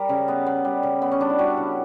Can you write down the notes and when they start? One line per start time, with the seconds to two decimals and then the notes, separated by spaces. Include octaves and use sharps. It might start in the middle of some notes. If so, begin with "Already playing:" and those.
Already playing: G3 A#4
0.09 C#3
0.28 B3
0.46 B3
0.65 G3
0.83 C#3
1.02 B3
1.12 C#4
1.20 G3 D4
1.30 E4
1.39 G3 F#4
1.57 C#3